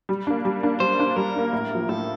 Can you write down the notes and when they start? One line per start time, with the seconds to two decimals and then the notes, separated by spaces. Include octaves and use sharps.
0.09 G3
0.27 A#3 D4
0.45 G3
0.63 A#3 D4
0.80 G3 C5
0.99 A#3 D4
1.16 G3 A#4
1.35 A#3 D4
1.53 A2
1.71 F3 A#3
1.89 A2 A4